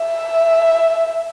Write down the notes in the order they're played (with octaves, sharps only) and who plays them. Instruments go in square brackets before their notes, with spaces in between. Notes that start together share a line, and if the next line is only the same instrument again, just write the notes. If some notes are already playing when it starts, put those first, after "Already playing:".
Already playing: [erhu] E5